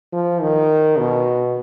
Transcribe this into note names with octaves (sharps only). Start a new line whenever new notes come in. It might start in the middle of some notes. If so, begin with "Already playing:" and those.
F3
D#3
B2